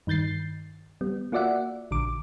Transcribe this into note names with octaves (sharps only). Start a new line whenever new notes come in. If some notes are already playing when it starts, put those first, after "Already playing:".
G2 D#3 G6 A6 C7
G3 B3
A#3 F4 F#4 D5 E5 F#5
A#1 D3 D6